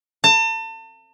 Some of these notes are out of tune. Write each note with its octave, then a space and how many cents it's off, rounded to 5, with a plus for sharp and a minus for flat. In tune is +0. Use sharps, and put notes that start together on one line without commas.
A5 +40